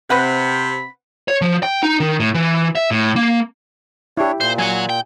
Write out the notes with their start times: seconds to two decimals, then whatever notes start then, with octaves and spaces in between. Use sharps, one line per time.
0.10 C3 C4 B4 F#5 B5
1.28 C#5
1.41 F3
1.63 G5
1.83 D#4
2.00 D#3
2.20 A2
2.34 E3
2.75 E5
2.91 A2
3.16 A#3
4.17 D4 E4 G4 C#5
4.41 A#2 C5
4.59 F#3 F#5 G#5
4.89 G5